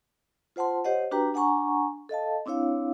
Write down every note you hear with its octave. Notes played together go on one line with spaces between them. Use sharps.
F4 C5 F#5 A5 C6
G4 C5 C#5 D#5 F#5
D4 F#4 G4 B4 G5 A#5
D4 F#5 G#5 A#5 C#6
A4 D#5 F5 A5
C4 D4 E4 C#5 F5